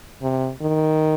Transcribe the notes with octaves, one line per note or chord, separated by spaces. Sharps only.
C3
D#3